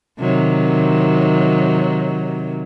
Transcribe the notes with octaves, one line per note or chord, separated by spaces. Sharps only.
C3 D#3 F#3